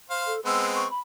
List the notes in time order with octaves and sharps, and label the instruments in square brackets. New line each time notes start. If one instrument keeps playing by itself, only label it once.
[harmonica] C5 F5
[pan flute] A4
[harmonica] G#3 B3 C4 [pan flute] E6
[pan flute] C#6
B5